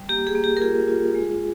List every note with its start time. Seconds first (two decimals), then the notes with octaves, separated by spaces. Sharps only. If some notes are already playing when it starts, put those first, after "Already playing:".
Already playing: G3
0.09 A#3 G4
0.27 G#4
0.35 A#3
0.44 G4
0.57 A#4
0.61 F4 G#4
0.88 F4
1.15 G#3